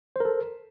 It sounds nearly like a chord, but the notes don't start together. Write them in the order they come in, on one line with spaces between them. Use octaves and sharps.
C5 A#4 A4